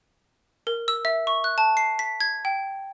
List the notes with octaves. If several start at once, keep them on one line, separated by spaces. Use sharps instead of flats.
A#4
E6
E5
C#6
F#6
A5
C7
B6
G#6
G5